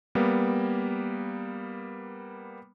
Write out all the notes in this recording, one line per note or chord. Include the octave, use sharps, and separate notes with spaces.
G3 A#3 B3